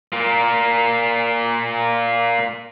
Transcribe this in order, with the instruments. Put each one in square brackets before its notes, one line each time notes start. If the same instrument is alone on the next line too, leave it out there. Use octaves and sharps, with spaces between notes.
[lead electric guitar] A#2 A#3